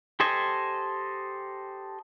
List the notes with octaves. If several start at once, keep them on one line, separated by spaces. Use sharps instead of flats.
G4 A4 C5 D#5 G#5